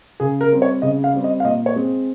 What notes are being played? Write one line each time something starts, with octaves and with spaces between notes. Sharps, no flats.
C#3 G#4
A#4
G3 C4
C#5
C#3 D#5
F5
G3 C4
D#5
F5
A#2 D#5
C#5
G#3 C4